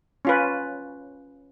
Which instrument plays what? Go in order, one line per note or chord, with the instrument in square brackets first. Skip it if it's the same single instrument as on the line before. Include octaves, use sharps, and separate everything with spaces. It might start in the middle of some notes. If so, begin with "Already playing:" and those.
[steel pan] C#4 F4 B4